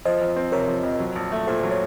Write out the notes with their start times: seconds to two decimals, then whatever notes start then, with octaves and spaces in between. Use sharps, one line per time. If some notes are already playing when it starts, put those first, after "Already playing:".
0.05 F3 C5 D#5
0.21 F2
0.36 C4
0.52 C3 A#4 C#5
0.68 F3
0.83 F2
1.00 F#3
1.16 A#1
1.32 A3
1.47 A#2 A4 C5
1.59 F#3 C5
1.71 C#5